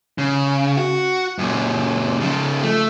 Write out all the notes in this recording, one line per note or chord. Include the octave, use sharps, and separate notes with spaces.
C#3
F#4
F#2 A#2
C#3 F3
A3